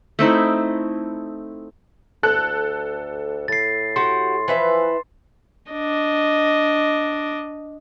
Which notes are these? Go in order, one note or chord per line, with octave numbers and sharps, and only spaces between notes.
A3 C4 D#4 E4
D2 A4 F#6
A2 A6 C7
F#4 G4 F#5 C6
E3 F3 B4 E5
D4 D#5